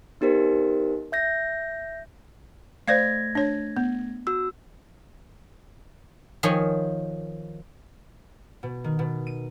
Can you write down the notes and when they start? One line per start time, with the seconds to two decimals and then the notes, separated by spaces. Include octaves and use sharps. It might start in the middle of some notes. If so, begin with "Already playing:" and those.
0.21 B3 D#4 G4 A#4 C5
1.12 E5 G6 A#6
2.88 A3 C5 D5 F5 G#6 A#6
3.35 D4 C#5
3.77 B3
4.27 F#4 E6
6.43 D#3 F3 C#5 G#5
8.63 B2
8.84 D#3
8.99 B2
9.27 D#7